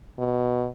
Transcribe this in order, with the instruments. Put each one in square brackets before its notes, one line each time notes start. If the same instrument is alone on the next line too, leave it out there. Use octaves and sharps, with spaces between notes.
[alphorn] B2